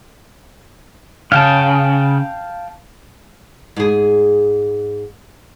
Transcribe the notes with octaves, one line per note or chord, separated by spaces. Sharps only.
C#3 F5 G5 A5
G#2 G#4